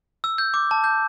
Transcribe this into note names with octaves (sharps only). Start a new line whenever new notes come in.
E6
G6
D6
A5
G6